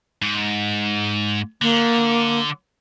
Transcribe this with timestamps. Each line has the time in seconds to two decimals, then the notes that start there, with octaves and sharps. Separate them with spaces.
0.22 G#2
1.62 D3 A#3